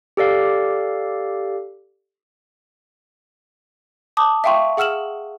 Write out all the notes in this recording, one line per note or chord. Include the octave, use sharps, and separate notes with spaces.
G4 A4 D5 F5
A5 D6 D#6
E5 F5 G5 C6 C#6
G#4 F#5 E6 F6 E7 F#7